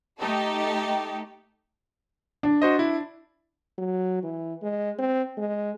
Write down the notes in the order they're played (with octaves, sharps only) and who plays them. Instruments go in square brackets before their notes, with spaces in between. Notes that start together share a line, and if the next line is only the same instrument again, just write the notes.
[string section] A3 D#4 G4 A4
[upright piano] D4
[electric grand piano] F#4 C5 D#5
E4
[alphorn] F#3
E3
G#3
C4
G#3